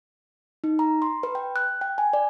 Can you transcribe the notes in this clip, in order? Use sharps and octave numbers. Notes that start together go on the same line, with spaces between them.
D#4
A#5
C6
B4
G5
F#6
G5
G#5
D5